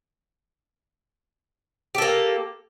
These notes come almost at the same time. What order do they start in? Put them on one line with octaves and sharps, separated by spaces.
G4 A4 A#3